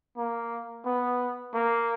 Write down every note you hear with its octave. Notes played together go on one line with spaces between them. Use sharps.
A#3
B3
A#3